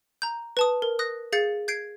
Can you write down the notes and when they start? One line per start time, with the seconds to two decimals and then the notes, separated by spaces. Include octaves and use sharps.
0.22 A#5 G6
0.57 B4 A5 D#6
0.82 A#4
0.99 D#6 F#6 A#6
1.32 G#4 F5 G6 A6 C#7
1.68 G6 G#6 C7 D7